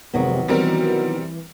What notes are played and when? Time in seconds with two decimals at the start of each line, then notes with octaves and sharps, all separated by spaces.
0.14 G#1 F2 C3 D#3 F#3 B3
0.48 B2 E3 G3 C4 A#4